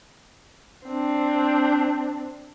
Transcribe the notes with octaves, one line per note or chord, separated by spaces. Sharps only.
C4 D4